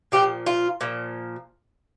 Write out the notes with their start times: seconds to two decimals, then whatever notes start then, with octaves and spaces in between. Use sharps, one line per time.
0.12 A#2 F3 G4
0.46 F4
0.81 A#2 F3